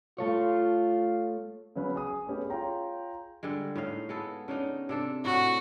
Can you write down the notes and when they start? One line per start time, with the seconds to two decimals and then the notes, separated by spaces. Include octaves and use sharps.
0.18 A3 F4 A4 C#5
1.76 C#3 F#3 B3 C#4 B4
1.96 G#4 G#5 D#6
2.27 A3 B3 C#4 G4 G#4
2.50 F4 G#4 C#5 G5 A#5 C6
3.43 D3 G3 G#3
3.76 A2 D#4 F5
4.09 G#3 B3 A4
4.48 C#3 D4 D#4
4.89 C3 D4 A4
5.25 A2 F#4